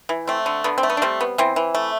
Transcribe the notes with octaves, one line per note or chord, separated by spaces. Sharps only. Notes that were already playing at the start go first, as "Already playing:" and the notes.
E3
A3 C4
D3
D3 B3
C4
A3
B3
D4
G3 C4
B3
E3 C4
E3
A3